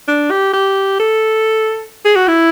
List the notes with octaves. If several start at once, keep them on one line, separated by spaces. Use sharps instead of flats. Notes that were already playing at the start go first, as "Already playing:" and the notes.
D4
G4
G4
A4
G#4
F#4
E4